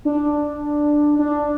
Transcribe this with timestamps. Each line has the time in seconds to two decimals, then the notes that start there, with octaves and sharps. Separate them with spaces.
0.05 D4
1.19 D4